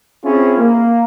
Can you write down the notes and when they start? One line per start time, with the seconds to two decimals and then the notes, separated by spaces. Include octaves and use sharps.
0.23 C4 C#4 E4 F4 G#4
0.58 A#3